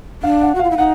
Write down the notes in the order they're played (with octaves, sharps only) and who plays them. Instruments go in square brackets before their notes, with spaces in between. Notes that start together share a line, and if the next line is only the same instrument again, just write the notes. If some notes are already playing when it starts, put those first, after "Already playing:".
[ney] D4 [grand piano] F5
[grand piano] F#5
[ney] F#4
[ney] F4 [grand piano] F5
[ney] E4
[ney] D#4 [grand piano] F#5